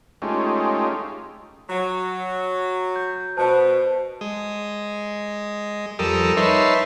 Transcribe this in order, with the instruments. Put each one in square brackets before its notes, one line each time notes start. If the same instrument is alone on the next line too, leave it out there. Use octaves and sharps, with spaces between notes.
[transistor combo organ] G#3 A3 C#4 D#4 F4 G4
[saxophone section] F#3
[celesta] G6
[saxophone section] B2 [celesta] C5 A5
[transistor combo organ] G#3 D#5
F2 G3 A4 A#4 D#6 E6
D#4 B4 C#5 E5 A5 C6